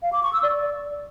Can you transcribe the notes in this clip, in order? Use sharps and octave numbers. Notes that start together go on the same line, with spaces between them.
F5
D6
C#6
E6
D5